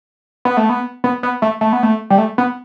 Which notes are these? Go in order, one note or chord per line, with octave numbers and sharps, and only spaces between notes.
B3
A3
B3
B3
B3
A3
A3
B3
A3
G3
A3
B3